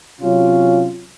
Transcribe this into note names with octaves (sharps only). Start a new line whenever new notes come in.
C3 F#3 C#4 F4